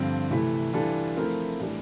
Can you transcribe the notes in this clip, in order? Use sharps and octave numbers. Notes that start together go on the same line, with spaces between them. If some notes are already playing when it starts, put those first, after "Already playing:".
Already playing: G2 D3 F3 C4
C3 E3 A3 E4
E3 G3 D4 F4 A4
F3 A3 C4 E4 A#4
A2 E3 G3 D4